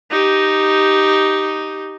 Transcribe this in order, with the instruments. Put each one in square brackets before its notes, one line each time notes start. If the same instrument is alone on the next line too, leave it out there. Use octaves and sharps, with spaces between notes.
[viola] D#4 G4